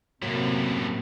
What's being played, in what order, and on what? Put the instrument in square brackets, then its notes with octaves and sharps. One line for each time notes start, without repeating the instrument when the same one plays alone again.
[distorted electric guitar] F#2 A2 [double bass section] C3 [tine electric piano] F#3 A#3